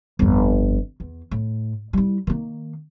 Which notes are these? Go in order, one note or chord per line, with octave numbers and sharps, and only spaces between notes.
G1 F2
E2
A2
G3 E4
D#3 A#3